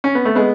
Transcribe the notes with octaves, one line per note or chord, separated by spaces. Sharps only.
C#4
B3
A3
G#3 B3